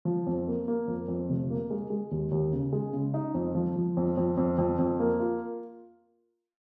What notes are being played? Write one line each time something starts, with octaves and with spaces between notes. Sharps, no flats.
F3
F2
A#3
A#3
F2
F2
F1
A#3
G#3
G#3
D#2
D#2
C#3
G#3
C#3
D#4
F2
F3
F3
F2
F2
F2
F2
F2
A#3
F4